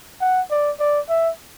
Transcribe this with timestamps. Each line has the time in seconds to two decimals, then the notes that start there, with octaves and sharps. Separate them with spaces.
0.21 F#5
0.51 D5
0.80 D5
1.09 E5